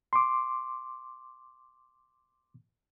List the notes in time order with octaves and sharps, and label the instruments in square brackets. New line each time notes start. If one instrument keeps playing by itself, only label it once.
[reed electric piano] C6 D6